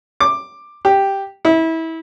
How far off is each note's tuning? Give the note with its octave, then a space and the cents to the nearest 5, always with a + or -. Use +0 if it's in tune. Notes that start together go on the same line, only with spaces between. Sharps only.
D6 +10
G4 +0
E4 -25